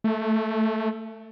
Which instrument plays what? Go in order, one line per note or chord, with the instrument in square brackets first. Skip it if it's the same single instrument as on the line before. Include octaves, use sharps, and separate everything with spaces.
[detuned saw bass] A3